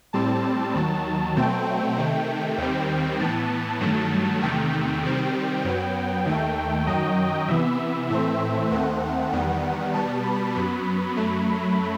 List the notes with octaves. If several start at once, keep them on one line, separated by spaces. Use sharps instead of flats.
A2 G3 C4 A5
D#2 D#3 F#3
B2 F#3 A3 C4 G5
C3 D#3 A3
D#2 D#3 G3 C4
A2 E3 B3 A5
G2 D#3 F#3 A3
E2 C3 D#3 A3 G5
C3 D#3 G3 C4
F#2 F#3 B3
D#2 D#3 A3
F#2 D#3 F#3 D#5
C3 E3 B3 E5
A2 E3 A3 C4
D#2 D#3 A3 C4 F#5
E2 D#3 G3 B3
B2 G3 B3 A5
B5
F#2 F#3 B3 B5
F#2 F#3 A3